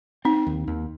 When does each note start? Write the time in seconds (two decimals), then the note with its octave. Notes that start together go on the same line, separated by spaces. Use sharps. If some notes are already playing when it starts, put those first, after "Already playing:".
0.25 C4 D#4
0.47 D#2
0.67 D#2